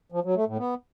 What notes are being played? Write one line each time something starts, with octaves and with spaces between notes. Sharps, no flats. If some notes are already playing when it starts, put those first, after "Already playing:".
F3
F#3
A3
A2
B3